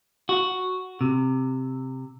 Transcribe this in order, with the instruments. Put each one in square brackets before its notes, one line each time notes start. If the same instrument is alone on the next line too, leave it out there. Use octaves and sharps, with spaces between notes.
[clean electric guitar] F#4
C3